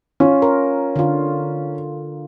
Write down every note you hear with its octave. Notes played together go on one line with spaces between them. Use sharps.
C#4 F4
A#4
D3 F4